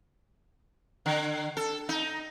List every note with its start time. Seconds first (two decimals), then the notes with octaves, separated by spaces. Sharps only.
1.06 D3
1.57 A4
1.89 D#4